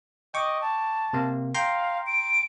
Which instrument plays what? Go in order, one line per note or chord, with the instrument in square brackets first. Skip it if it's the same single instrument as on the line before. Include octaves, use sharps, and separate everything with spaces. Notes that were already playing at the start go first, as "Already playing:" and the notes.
[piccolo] D#5 [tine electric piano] G5 C#6 D6
[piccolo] A5
[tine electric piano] C3 A#3
[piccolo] F5 [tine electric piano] G5 A#5 C6
[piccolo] D7